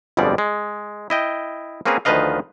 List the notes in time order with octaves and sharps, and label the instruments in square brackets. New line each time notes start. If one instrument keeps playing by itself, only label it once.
[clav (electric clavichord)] G1 F2 B2 G3 G#3 D5
G#3
E4 D#5 G5
A#3 C4 C#4 G#4 B4 A#5
D2 D#3 F3 B4 D#5 F5